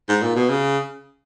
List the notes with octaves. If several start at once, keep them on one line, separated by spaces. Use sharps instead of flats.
G#2
A#2
B2
C#3